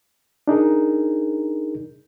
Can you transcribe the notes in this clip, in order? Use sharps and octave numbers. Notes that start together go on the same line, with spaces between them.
D4 D#4 G#4 A#4